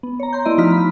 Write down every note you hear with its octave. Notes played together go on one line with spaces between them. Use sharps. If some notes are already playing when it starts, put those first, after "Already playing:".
B3
C#5 A#5
A#5 C6 G6
A3 B3 E4 D5 D#5 C6
F3 D#4 F#4 A#5 F6 B6
B5